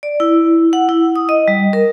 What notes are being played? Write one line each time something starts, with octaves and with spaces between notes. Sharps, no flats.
D5
E4
F#5
E4
D#6
D#5
G3
A#4